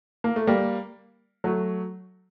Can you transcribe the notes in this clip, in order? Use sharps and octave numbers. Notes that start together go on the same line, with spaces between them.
A#3
A3
G3 A#3
F#3 A3